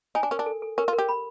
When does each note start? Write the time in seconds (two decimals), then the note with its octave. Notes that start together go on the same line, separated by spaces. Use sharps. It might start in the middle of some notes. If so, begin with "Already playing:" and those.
0.15 D#4 G#5
0.23 D4
0.31 C#4 A#4
0.39 D4
0.46 A4
0.62 A4
0.78 C#4 A#4
0.88 F4
0.93 A#4
0.98 G4
1.09 B5